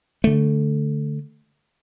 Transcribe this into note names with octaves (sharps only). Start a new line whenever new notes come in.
D3 A3